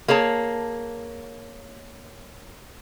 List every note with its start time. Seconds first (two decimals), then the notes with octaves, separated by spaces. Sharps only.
0.08 A#3 G#4 C#5 A5